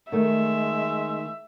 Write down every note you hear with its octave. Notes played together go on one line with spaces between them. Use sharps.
D#3 G#3 A3 E5